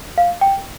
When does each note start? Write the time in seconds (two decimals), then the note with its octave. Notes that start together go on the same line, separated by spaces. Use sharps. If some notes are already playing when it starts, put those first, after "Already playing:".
0.18 F5
0.41 G5